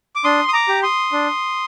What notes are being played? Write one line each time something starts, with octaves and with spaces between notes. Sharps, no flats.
D6
D4 C6 D#6
D#6
A#5 D6
G4
C6 D#6
D4